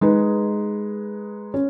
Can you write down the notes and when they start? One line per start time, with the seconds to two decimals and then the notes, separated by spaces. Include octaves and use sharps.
0.01 G#3 D#4 G#4 B4
1.54 C#4